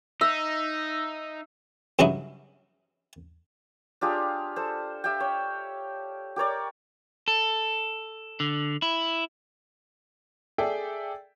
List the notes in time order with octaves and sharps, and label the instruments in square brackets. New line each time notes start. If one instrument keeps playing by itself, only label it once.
[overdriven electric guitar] D#4 [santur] E5
[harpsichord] G2 C#3 F#3 C#4 D#4 E4
[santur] D4 F4 G4 G#4
A4 C5
G4 E5 F5 G5
C#5
G4 A#4 C#5 D5
[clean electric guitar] A4
D3
E4
[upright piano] G#4 A4 D5 E5 G5